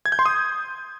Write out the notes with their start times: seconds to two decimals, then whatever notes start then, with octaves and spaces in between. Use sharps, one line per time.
0.06 G#6
0.12 G6
0.19 C6
0.26 D#6